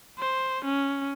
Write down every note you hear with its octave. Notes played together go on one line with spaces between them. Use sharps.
C5
C#4